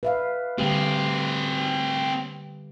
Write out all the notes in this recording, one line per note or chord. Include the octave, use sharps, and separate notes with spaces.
B4 E5 F5
D3 G3 C4 G4 G#4